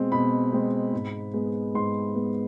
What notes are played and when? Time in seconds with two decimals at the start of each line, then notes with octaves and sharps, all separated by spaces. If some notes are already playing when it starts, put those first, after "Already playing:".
Already playing: B2 G#3 C4
0.12 B2 B5
0.52 G#3 C4
0.93 G#2
1.34 G#3 B3
1.74 G#2 C6
2.15 G#3 B3